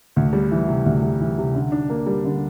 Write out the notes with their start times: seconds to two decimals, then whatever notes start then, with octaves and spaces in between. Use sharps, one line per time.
0.16 D2
0.33 G3
0.51 E3
0.68 C3
0.86 D2
1.03 G3
1.20 E3
1.38 C3
1.55 D3
1.72 D4
1.90 A#3
2.06 G3
2.24 D3